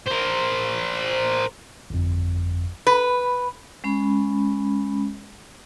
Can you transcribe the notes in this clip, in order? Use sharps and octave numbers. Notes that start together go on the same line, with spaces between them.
A#4 C5
G1 F2
B4
G#3 C#4 B5